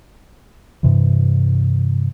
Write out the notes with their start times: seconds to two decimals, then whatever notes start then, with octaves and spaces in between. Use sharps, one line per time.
0.83 G2 C3 E3